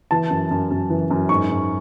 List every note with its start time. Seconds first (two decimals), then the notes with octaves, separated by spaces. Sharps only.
0.11 E3 A5
0.30 F#2
0.51 F#2
0.71 F#2
0.90 E3
1.11 F#2
1.29 G#2 C#6
1.50 G#2